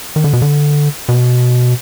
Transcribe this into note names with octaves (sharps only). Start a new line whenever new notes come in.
D#3
D3
B2
D3
B2